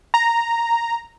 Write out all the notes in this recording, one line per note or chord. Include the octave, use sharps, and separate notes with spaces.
A#5